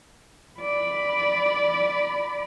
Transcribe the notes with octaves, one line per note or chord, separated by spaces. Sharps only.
D5 B5